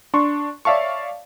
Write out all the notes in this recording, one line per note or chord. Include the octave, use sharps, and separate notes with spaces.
D4 C6 C#6
C#5 D5 E5 F5 A5 C#6